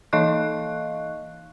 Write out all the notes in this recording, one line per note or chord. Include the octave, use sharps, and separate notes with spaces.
E3 D#4 D#5 F5 C#6 F#6